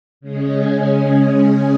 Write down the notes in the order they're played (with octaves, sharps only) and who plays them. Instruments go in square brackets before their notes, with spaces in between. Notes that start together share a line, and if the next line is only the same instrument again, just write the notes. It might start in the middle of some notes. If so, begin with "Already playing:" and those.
[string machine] C#3 G#3 C#4 G#4